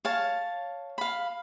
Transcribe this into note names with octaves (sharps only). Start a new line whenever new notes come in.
C#5 F5 A5
F5 B5